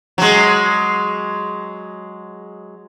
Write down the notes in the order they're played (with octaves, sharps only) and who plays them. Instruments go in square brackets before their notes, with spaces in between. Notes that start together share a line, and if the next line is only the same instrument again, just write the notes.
[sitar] F#3 G#3